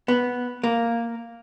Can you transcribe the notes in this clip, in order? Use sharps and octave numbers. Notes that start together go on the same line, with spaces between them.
B3
A#3